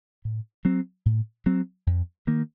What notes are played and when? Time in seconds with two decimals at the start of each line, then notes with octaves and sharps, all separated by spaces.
0.25 A2
0.65 F#3 C4
1.06 A2
1.46 F#3 C4
1.87 F2
2.27 D#3 A#3